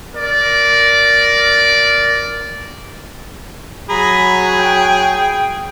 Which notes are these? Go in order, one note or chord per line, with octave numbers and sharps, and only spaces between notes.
A#4 D5
F#3 G#4 A#5 B5
G5